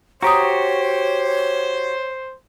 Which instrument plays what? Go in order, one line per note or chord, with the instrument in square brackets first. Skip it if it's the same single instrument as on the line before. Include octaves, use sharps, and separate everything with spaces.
[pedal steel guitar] F#4 G4 [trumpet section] C5 [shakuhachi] C#5 [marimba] A#5 D#6